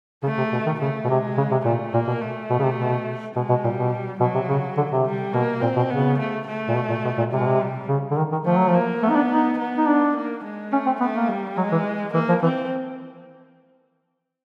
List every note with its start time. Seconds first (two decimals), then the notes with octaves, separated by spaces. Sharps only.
0.23 C#3 A3
0.38 C3
0.52 B2
0.66 D#3
0.80 C#3 A3
1.04 B2
1.09 C3 G#3
1.37 C#3
1.51 C3
1.65 A#2 A3
1.93 A#2 A#3
2.07 B2
2.22 A3
2.50 B2
2.59 C#3
2.64 C3
2.78 B2
3.35 B2 G#3
3.49 B2
3.64 A#2 G3
3.77 B2
4.20 B2 F#3
4.35 C3
4.48 C#3
4.77 D3
4.92 C3
5.06 G3
5.33 B2 A#3
5.61 A#2 C4
5.76 B2
5.90 C#3 B3
6.19 A3
6.47 A3
6.68 A#2
6.75 B2
6.89 A#2
7.04 B2
7.18 A#2
7.32 C3 G#3
7.40 B2
7.47 C3
7.61 G3
7.88 C#3
8.11 D3
8.17 D#3
8.32 D#3
8.45 F3 A3
8.57 F#3
8.68 F3
8.74 A#3
9.02 A3 B3
9.10 D#4
9.16 D4
9.31 D#4
9.59 B3
9.77 D#4
9.87 D4
10.16 A#3
10.44 G#3
10.72 A3 C#4
10.86 C4
11.00 A3 B3
11.15 A#3
11.29 G3
11.57 F#3 G#3
11.72 E3
12.14 E3 A#3
12.28 F3
12.42 E3 C4